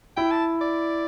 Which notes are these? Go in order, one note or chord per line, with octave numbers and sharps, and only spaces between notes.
E4 G5
A5
D5